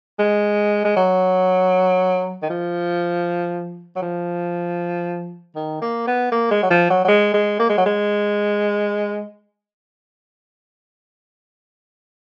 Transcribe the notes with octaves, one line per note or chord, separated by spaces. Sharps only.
G#3
G#3
F#3
D#3
F3
F#3
F3
D#3
A#3
B3
A#3
G#3
F#3
F3
F#3
F#3
G#3
G#3
A#3
G#3
F#3
G#3